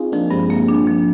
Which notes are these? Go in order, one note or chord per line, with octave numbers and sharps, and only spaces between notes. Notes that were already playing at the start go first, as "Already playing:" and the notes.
Already playing: C4 D#4 F4 G#4
F3 A#3 D4
G2 G#3 C4
A#3
D4
F3